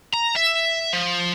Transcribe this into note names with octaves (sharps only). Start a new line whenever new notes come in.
A#5
E5
F3